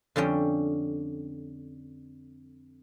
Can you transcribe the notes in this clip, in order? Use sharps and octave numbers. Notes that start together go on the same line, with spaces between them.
F2 D3 G3 C#4 G5